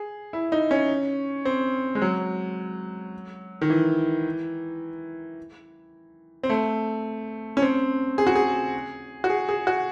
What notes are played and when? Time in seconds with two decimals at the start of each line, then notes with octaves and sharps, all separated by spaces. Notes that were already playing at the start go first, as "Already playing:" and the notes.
Already playing: G#4
0.33 E4
0.52 D#4
0.71 C#4
1.45 C4
1.95 G#3
2.02 F#3
3.62 D#3
3.70 E3
6.43 C4
6.50 A3
7.57 C#4
7.62 C4
8.18 G#4
8.27 F#4
8.35 G#4
9.24 F#4
9.30 G#4
9.49 G#4
9.67 F#4